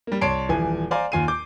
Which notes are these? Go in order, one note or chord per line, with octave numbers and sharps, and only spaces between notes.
G3 A#3
C2 C#5 A5 C6 C7 D7
D#1 E3 F3 G#5
C5 D5 F5 G#5 A#5
D#2 F4 G#5 C7 D#7
D6 G6